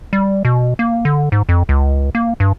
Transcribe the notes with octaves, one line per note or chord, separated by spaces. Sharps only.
G3
B2
A#3
D3
G#2
F2
C#2
A#3
G2